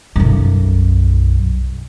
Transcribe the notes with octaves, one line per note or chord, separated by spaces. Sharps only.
B1 F#2